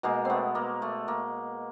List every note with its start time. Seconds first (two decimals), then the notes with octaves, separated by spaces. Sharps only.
0.03 B2 G#3 A#3
0.25 A3 B3 C4
0.55 A#3
0.82 A3
1.08 A#3